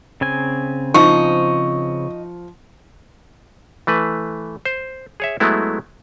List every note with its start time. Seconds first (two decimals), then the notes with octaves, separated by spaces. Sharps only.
0.21 C#3 C4 G#5
0.94 F3 D#4 C#6
3.87 E3 A3 B4
4.65 C5
5.20 G#4 C#5 E5
5.40 F#3 G#3 A3 B3 E4